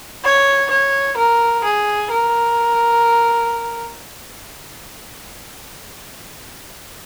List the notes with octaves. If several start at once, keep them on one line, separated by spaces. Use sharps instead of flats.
C#5
C#5
A#4
G#4
A#4